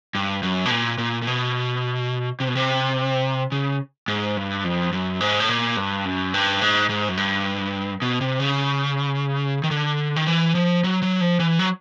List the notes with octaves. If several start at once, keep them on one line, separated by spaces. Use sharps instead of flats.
G2
F#2
B2
A#2
A#2
A#2
B2
C3
B2
C3
C#3
G#2
G2
F2
F#2
G#2
A2
A#2
G2
F#2
G2
G#2
G#2
F#2
G2
B2
C3
C#3
D#3
D3
D#3
E3
F3
F#3
F#3
F3
E3
F#3